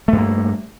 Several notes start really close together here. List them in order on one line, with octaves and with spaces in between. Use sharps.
A3 G2 A#3